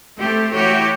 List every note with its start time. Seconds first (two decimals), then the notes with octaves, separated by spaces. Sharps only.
0.18 A3 C4 G4 A4
0.55 E3 A3 E4 F#4 G4 C#5